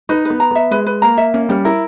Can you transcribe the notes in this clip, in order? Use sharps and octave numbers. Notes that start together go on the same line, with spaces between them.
D#4 B4
B3 B4
A#5
B3 E5
G#3 B4
B4
A#3 A#5
E5
A#3 C#4
G3 C#4
E4 A#4